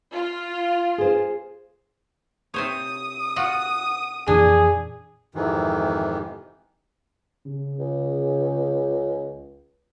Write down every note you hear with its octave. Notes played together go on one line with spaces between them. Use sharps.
F4
G#4 C5
C3 C5 C#5 D#6
F4 F#4 F#5
F2 A#2 E3 D4 G#4
F2 G#2 C3 D#3 E3
C#3
C#2